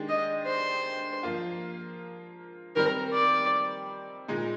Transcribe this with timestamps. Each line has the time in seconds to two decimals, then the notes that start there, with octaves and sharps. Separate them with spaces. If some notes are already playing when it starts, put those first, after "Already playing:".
Already playing: D#3 G#3 D4 G4
0.09 D#5
0.47 C5
1.23 F3 A#3 F4
2.76 D#3 G3 C4 A#4
3.13 D5
4.28 A#2 G#3 D#4